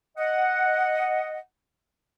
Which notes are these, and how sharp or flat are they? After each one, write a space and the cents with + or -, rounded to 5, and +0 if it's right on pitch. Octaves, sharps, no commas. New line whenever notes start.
D#5 +0 F#5 +0